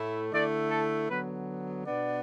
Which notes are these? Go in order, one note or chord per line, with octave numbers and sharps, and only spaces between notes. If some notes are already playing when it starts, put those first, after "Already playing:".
Already playing: A2 A3 E4
D3 A3 E4 D5
A4
D3 F#3 B3 B4
B2 B3 D4 D5